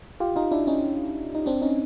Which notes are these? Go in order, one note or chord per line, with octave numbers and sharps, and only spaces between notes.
F4 G4
D#4 F4
D4 E4
C#4 D#4
D#4
C4 D4
C#4 D#4